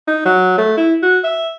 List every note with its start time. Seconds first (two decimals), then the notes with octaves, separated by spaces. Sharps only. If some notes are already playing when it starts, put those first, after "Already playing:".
0.08 D#4
0.25 F#3
0.58 A3
0.77 E4
1.03 F#4
1.24 E5